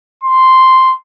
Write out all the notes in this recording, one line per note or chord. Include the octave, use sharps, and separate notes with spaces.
C6